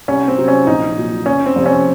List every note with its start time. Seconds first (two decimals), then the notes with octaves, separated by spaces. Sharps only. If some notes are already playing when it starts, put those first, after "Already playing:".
0.08 C2 C#4
0.28 C4
0.38 C3 F#3
0.48 C#4
0.67 A#1 D#4
0.97 A#2 F#3
1.26 F#1 C#4
1.46 C4
1.56 F2 C3
1.66 C#4